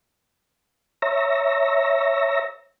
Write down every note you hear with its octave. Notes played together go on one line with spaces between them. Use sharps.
C#5 E5 A#5